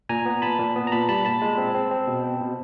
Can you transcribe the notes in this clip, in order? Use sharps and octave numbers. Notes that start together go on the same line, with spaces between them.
A#2 G#5 A#5
B3
A#2 A5 B5
A#2
B3
A#5
A#2 A5 B5
G3 A5 B5
A#2 A5 B5
G#3
C4
C4
C4
B2
C4
B2